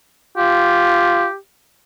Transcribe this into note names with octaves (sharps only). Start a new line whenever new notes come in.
F4 G4